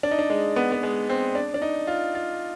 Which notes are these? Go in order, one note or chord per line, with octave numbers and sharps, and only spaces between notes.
D4
D#4
D4
G#3
B3
B3
G#3
C4
D4
D4
D#4
F4
F4